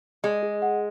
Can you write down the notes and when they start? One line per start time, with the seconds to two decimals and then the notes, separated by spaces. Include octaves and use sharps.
0.24 G#3 G#4
0.43 G#4
0.62 F#5